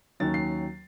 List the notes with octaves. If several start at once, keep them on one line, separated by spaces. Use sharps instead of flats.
D#2 D#3 F#3 C#4 A6
C7